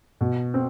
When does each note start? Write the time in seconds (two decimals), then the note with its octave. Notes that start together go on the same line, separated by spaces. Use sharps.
0.21 B2
0.54 C4